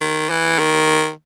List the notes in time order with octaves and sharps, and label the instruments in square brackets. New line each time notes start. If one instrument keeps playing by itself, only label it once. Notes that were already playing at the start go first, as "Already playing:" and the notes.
[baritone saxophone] D#3
E3
D#3